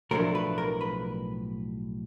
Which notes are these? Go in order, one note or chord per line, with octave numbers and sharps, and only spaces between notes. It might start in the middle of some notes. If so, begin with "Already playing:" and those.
B1 A2 F3 A3 D4 A#4
B4
A#4
B4